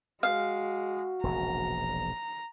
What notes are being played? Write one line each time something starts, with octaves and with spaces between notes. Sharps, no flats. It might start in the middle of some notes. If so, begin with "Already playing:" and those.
G#3 F#4 F5
E1 A#1 C#3 A#5